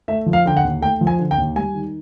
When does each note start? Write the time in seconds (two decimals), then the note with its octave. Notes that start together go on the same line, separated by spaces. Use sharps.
0.08 A3 E5
0.26 F3
0.33 F5
0.45 D3 G5
0.57 F#5
0.64 D#2
0.81 A3 G5
1.01 F3
1.07 G#5
1.19 D3
1.31 G5
1.37 D#2
1.56 G3 G#5
1.75 D#3